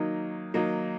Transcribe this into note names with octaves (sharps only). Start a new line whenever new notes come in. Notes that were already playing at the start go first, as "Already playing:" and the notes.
Already playing: D#3 F#3 A#3 D#4
D#3 F#3 A#3 D#4